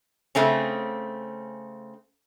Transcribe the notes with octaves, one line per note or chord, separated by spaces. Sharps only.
C#3 A3 C4 C#4